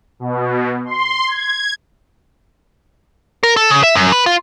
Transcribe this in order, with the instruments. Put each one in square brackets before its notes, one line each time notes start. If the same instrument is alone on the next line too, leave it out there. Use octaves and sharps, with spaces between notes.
[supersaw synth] B2
C6
G#6
[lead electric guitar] A#4
A4
C#3
E5
F#2
B4
F4